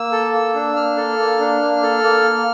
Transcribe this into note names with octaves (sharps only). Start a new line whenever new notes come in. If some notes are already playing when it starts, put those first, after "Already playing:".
Already playing: A#3 E6
A4
A#3
D4
A#3 F6
A4
A#3
D4
A#3
A4
A#3